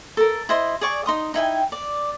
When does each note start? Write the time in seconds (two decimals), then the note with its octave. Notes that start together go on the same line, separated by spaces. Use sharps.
0.17 A4 A#4
0.49 E4 C5 D#5 C6
0.81 G#4 D5 C#6
1.06 D#4 C6 D#6
1.34 D#4 E4 G5 G#5
1.72 D5